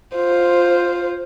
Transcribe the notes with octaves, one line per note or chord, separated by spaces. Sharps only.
F4 C5